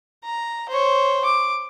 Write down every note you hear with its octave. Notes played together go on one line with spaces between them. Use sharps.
A#5
C5 C#5
D6